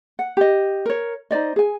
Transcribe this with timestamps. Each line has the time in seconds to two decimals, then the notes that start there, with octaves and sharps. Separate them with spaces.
0.19 F#5
0.37 G4 D#5
0.86 A#4 C#5
1.31 D#4 C5 D5 D#5
1.56 G#4 G#5